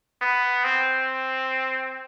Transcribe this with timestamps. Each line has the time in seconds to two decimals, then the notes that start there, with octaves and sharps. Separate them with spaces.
0.21 B3
0.64 C4